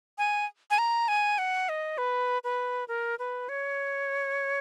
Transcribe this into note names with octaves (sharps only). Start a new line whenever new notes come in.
G#5
G#5
A#5
G#5
F#5
D#5
B4
B4
A#4
B4
C#5